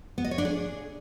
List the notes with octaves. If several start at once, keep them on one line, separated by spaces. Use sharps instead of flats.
B3
D#5
C#5
D4
G#4